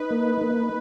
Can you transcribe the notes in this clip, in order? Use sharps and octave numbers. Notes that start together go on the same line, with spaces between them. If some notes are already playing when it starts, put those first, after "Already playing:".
Already playing: D#4 B4
A#3
A#3